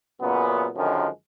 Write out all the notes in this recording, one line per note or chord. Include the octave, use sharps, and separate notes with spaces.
F#2 A#2 C#3 B3
F#2 D3 D#3 F3 G#3 C#4